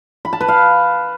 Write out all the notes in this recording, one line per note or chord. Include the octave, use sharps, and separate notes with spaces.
B5
A5
B4
F5